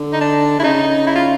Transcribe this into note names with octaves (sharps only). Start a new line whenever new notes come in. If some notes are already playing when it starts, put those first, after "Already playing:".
Already playing: D3
D#4
D4
D3 E4
C#3 D#4
E4
F4